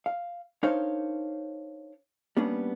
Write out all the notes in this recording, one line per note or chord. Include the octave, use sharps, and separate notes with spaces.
F5
D4 D#4 A#4 C5 C#5 F5
G3 A#3 B3 C#4 D4